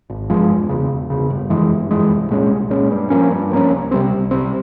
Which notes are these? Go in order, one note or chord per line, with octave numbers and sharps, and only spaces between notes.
G#1
G2 F3 G#3
E1
E2 C#3
E1
E2 C#3
G1
F2 E3 G#3
G1
F2 E3 G#3
C2
A#2 G#3 C#4
C2
A#2 G#3 C#4
G2
F3 A#3 C#4
G2
F3 A#3 C#4
C2
C3 G3 C4
C2
C3 G3 C4